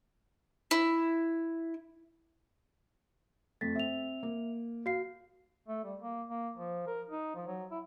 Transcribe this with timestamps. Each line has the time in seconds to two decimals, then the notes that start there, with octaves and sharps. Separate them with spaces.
0.71 E4
3.61 F2 A3 A6 B6
3.76 C4 E5 F7
4.23 A#3
4.86 F#4 F5 C7
5.68 A3
5.84 G3
6.01 A#3
6.29 A#3
6.57 F3
6.87 A#4
7.10 D#4
7.35 F3
7.47 F#3
7.71 E4